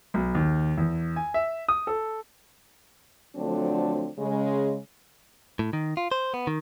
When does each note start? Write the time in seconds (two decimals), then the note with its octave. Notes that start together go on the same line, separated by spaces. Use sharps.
0.14 B1
0.35 D#2
0.78 E2
1.16 G#5
1.34 E5
1.68 D#6
1.87 A4
3.36 D3 F3 F#3 A3 C4 D4
4.18 C#3 G#3
5.59 A2
5.73 D#3
5.97 F4
6.12 C5
6.34 B3
6.47 D#3